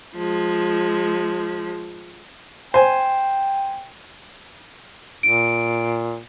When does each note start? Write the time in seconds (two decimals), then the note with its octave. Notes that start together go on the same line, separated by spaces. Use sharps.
0.17 F3 G#3
2.74 C5 G5 G#5
5.23 A#2 D7